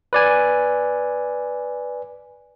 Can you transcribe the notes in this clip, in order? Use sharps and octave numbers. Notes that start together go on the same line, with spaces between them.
B4 D5 G#5